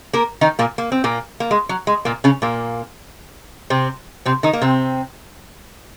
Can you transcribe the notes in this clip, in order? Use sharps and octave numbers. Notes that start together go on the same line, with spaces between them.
A#3 A#4
D#3 D#4
A#2 A#3
A#3
C4
A#2 A#3
A#3
G#3
F#3
G#3
A#2 A#3
C#3 C#4
A#2 A#3
C3 C4
C3 C4
D#3 D#4
A#3
C3 C4